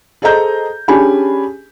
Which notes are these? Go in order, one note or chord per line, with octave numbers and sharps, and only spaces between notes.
G#4 A4 C5 D#5 A#5 G6
C#4 D4 G4 G#4 G#5 B5